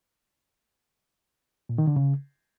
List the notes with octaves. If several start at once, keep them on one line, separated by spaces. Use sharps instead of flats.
A#2
D#3
D3
C#3